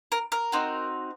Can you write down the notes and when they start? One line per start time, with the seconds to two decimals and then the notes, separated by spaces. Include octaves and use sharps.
0.12 A#4
0.32 A#4
0.52 C4 D#4 F#4